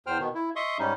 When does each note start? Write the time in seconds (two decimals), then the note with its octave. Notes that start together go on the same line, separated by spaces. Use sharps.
0.07 E2 C5 G5 F6
0.19 B2 D#3
0.35 E4
0.56 D#5 E5 C6 C#6 D#6
0.79 G#2 G3 C#4 D#4